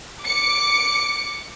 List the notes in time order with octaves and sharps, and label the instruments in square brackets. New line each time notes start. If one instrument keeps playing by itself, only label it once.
[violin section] D6 C#7